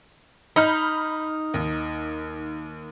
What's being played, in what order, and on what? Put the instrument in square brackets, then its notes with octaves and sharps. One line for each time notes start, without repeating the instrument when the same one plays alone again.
[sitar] D#4 [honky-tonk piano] B5 F6 G6
[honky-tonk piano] D#2